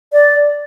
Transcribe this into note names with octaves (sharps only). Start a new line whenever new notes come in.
D5